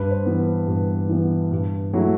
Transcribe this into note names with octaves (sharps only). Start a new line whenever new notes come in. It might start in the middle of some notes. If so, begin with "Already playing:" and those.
Already playing: G2 B4
C5
E3 B3
B4
G2
E3 B3
G2
F#3 A3 E4